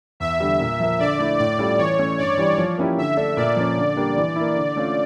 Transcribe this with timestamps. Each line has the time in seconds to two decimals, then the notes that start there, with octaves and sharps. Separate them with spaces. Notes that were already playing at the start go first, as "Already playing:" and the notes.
0.20 E2 E5
0.40 D3 G3
0.60 A#2
0.80 F3 A#3
0.99 D3 D5
1.19 A3 E4
1.39 A2 D5
1.59 G3 C#4 F4 A4
1.78 E3 C#5
1.99 A3 C#4
2.18 G2 D5
2.38 E3 G3
2.58 F3
2.78 A#3 C#4 E4 G4
2.97 D3 E5
3.17 A3 D4 A4 D5
3.36 A#2 D5
3.56 F3 A#3 C#4
3.77 D3
3.97 G3 A#3 D4 G4
4.17 E3
4.36 A#3 E4
4.55 D3
4.76 A3 C#4 F4